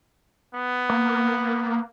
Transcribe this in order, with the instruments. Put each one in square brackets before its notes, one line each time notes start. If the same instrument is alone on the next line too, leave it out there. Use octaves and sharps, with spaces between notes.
[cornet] B3
[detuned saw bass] A#3